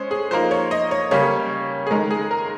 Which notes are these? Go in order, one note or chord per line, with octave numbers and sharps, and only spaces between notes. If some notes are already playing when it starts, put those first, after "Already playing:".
Already playing: G#3 C#4 C5 C#5
G#4
F3 A#3 D#4 C5
C#5
D#5
C#5
C#3 G3 A#3 C#4 C#5
G#4
D#3 G#3 D#4 A#4
G#4
A#4